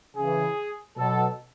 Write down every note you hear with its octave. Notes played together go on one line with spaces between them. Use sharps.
C#3 E3 G#4
B2 F#3 A4